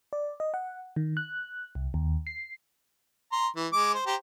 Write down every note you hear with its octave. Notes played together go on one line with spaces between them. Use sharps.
D5
D#5
F#5
D#3
F#6
C2
D#2
C7
A#5 C6
E3
G#3 D6
C5
G4 C5 A#5